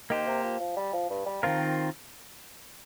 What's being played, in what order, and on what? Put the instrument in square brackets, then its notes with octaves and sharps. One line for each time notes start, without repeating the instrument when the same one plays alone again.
[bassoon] D#3 [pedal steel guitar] A#3 G4 C5
[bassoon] C3
F3
F3
G3
F3
G2
G3
[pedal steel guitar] D#3 C4 F4 A#4 [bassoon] F3